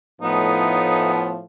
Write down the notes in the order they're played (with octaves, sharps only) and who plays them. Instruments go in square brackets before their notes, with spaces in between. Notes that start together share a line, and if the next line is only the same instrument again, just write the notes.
[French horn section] A2 F3 [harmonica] B3 [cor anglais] D#4